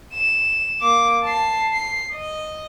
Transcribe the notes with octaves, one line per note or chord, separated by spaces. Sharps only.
E7
A#3 D6
A5 C7
C7
D#5